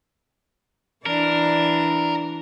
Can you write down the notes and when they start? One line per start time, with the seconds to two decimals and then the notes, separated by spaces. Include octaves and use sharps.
1.06 E3 D4 A#4